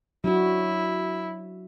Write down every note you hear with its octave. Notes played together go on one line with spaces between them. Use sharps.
F#3 D4 E4 F#4